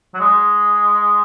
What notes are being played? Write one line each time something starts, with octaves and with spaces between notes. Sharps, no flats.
F#3
G#3